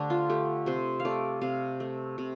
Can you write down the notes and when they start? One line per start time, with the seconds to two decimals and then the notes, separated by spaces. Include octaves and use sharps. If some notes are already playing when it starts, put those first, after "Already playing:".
Already playing: D3 A3 D4 G4 C5
0.10 F4
0.29 A3 G4
0.66 C3 C5
1.00 F5
1.05 A3 D5
1.41 C3 F5
1.80 A3
2.18 C3